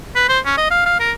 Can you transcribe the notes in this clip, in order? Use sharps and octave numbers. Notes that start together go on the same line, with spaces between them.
B4
C5
C#4
D#5
F5
F5
A#4